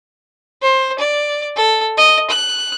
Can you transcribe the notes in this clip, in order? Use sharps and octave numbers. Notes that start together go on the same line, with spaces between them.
C5
D5
A4
D#5
F#6